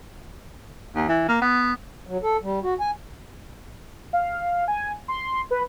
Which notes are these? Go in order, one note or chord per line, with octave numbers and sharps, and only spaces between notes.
D#2
E3
A#3
B3
F#3
A4
G3
F#4
G#5
F5
G#5
C6
B4